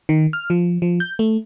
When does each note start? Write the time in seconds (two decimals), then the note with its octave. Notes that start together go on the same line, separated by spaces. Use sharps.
0.09 D#3
0.33 F6
0.50 F3
0.82 F3
1.00 G6
1.19 A3